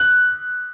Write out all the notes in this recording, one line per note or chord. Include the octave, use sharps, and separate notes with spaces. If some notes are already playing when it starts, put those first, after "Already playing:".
Already playing: F#6